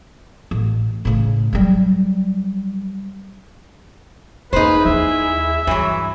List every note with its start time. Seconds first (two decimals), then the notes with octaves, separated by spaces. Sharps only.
0.51 A1
1.05 A2 C#3
1.53 F#3 G3
4.53 F1 A#3 D#4 G#4 B4 C5
4.85 D#2 A#3 E4 G#4 E5
5.67 G2 E3 F#3